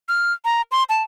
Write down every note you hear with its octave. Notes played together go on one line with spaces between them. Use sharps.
F6
A#5
C6
A5